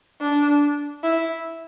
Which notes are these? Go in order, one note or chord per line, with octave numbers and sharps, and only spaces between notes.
D4
E4